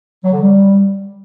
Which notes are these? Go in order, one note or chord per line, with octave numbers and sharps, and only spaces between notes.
F#3
D3
G3